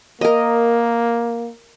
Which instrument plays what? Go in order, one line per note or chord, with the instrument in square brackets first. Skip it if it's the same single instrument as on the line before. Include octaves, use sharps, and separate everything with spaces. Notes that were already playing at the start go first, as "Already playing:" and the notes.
[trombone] A#3 [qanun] A#4 D#5